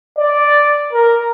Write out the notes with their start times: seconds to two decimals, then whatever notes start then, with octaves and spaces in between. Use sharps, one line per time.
0.18 D5
0.93 A#4